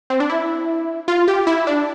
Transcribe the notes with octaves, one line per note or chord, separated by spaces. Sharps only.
C4
D4
E4
F4
G4
E4
D4